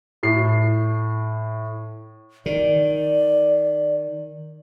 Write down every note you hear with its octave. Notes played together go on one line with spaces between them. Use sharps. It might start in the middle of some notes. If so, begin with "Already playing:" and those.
A2 C7
D#3 D5